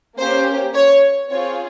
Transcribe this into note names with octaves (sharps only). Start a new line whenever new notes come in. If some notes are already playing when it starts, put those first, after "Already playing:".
A#3 C#4 G4 C5
C#5
C4 F4 G#4 C#5